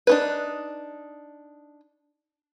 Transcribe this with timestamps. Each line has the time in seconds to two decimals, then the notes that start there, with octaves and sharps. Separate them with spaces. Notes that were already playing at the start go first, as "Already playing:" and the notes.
0.07 D4 D#4 B4